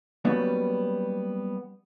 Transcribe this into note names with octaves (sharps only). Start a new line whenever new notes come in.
F#3 G3 A#3 B3 C#4